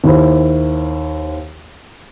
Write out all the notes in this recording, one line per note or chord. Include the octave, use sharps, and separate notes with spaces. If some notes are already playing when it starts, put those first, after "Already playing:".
D#2 E4 C5